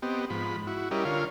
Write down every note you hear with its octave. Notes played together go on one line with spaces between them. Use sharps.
B3 C4 G4 D#5
G#2 F3 B5
E4 F#4
G3 C#4 E4 G4 A#4 D#5
D3 F4 A#4 C#5 F5